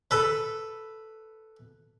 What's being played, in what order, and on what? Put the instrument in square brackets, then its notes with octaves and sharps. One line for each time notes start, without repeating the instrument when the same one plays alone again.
[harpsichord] A4 B4